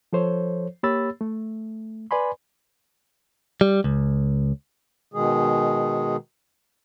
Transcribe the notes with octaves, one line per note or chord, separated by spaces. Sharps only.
F3 A4 C5 C#5
A#3 G4 C#5 B5 E6 A6
A3
B4 D5 G#5 B5 C6
G3
C#2
B2 D#3 G#3 G#4